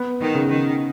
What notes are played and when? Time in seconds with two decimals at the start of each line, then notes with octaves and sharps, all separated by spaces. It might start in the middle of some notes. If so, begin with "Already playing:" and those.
Already playing: B3
0.20 D#3
0.35 C#3
0.49 D#3